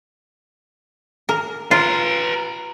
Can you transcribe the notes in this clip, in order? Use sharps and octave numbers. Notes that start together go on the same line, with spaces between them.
A#4
F4 B4 A#5